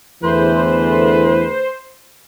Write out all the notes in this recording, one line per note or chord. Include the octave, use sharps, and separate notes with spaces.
E2 D3 E3 A3 G#4 B4 C5